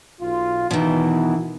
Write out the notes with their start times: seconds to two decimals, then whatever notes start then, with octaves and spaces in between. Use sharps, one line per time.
0.22 B1 F4
0.71 B2 D#3 E3